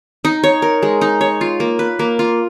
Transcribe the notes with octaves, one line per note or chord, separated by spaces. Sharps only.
D#4
C#5
A#4
G#3
D#4
C#5
F4
A#3
B4
A#3
F4